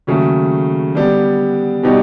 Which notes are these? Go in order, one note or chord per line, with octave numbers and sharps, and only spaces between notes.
D#2 C#3 F#3 A3
D3 G3 B3 D4 G4
B2 G3 B3 D#4 G4